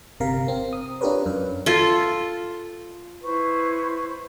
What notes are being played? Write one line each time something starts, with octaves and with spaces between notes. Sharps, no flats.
G1 C3 A#4 F5
C4
D#6
D4 F4 G4 A#4 B4 C#5
F#2 B4
F4 A4
E4 B4 C5 C#6